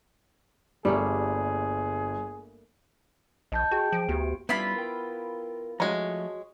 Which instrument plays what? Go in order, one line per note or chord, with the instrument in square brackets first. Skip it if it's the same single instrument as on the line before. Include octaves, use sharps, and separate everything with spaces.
[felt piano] G1 [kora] G3 A3 A#3 [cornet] G#4
[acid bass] A#1 [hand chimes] D#5 A5 G6
[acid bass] F#4 [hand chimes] G#4 G5
[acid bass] F3 [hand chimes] D7
[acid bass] D2 [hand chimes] B3 F#4 G4
[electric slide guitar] G3 C#4 D4 [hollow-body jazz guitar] B3 [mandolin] E4 F4 B5
[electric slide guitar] A#4 G5
[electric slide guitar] F3 A3 [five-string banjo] G#3 C#4 [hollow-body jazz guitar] F#4 A#5